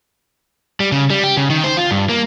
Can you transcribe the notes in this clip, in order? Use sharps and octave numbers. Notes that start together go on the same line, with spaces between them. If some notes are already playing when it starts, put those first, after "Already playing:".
G3
C#3
G3
G4
C#3
D#3
C5
F4
G2
A#3